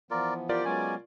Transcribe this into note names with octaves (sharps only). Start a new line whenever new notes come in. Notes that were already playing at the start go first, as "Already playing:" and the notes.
E3 F3 B3 F4 A#4 D5
F4 G4 A#4 D5 G5
F#3 G#3 B3 C#4 G#5